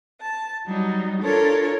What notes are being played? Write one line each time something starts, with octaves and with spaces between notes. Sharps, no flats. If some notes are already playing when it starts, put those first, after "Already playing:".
A5
F#3 G3 D#4
D4 F4 A4 A#4 C#5